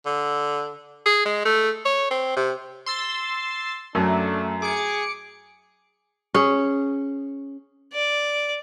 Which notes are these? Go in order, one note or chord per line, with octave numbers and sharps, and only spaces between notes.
D3
G#4
G#3
A3
C#5
C4
C3
C6 E6 A6
F#2 F#3 A3 D4
G#4 D6 C#7
C#4 G#4
D5